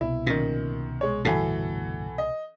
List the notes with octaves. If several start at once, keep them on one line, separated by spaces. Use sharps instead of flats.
C2 B2 E4
F#2 A#2 D#3
G#3 C#5
G1 A2 E3 F#4 A4
D#5